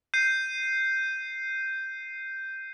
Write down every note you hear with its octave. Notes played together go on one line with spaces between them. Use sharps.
G6 C7 D#7